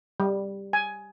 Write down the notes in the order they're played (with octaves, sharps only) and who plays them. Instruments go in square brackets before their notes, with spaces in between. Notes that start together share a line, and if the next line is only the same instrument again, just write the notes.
[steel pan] G3
G#5